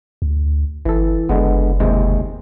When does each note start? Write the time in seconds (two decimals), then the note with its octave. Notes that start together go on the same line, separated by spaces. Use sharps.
0.22 D2
0.85 G1 E3 A4
1.29 F#1 D3 G#3 B3
1.80 D#2 C3 G#3